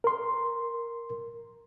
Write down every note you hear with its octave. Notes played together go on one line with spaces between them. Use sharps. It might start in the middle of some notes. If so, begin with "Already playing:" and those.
A#4 C6